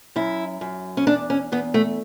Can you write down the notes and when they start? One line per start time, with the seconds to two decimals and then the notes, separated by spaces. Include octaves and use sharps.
0.16 F#2 E4
0.61 F#2
0.97 C#4
1.07 E2 D4
1.30 C#4
1.52 E2 B3
1.74 A3